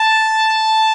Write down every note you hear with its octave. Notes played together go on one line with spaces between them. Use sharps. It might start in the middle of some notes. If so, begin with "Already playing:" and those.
Already playing: A5